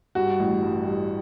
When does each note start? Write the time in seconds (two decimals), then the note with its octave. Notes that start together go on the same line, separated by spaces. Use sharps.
0.15 G2 F#4
0.39 A1
0.63 G2
0.86 G2